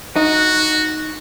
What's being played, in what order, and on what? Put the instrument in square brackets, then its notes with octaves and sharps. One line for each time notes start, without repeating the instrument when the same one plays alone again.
[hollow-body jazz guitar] D#4 [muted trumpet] F#4